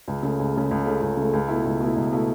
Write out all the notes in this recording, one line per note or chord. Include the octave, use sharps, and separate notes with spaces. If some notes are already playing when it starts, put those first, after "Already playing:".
C#2
C#3 A3
C#2
C#3 A3
C#2
C#3 A3
C#2
C#3 A3
C#2
B2 A3 E4
C#2
B2 A3 E4
C#2
B2 A3 E4